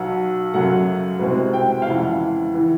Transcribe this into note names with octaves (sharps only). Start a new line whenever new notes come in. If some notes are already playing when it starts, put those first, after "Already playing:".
Already playing: B1 B2 F#3 F#5
F#2 C#3 F#3 A3 F#5
C2 B2 G#3 C4
G5
F5
F2 C#3 E3 G#3 F#5
E3